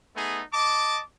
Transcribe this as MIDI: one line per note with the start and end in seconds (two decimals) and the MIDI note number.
0.16 0.42 57
0.16 0.42 59
0.16 0.42 63
0.16 0.42 68
0.53 1.02 75
0.53 1.02 81
0.53 1.02 86